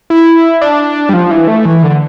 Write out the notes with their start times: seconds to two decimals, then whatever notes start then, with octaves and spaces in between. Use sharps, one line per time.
0.10 E4
0.61 D4
1.09 G3
1.13 F3
1.31 E3
1.48 A3
1.65 E3
1.83 D3